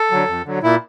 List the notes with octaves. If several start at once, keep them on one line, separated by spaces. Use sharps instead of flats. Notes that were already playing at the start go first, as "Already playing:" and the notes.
Already playing: A4
D3 F#3
F2
D3 F#3
A#2 E4